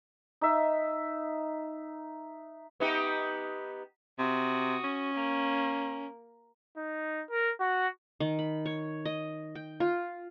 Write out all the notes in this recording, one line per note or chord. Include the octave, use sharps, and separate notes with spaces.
D#4 E5
B3 D#4 G4
C3 F#4 D#6
C#4
A#3
D#4
A#4
F#4
D#3
B5
C#5
D#5
G5
F4